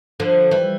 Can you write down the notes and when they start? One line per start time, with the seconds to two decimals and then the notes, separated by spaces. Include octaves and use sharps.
0.20 D3 F3
0.51 E3 G3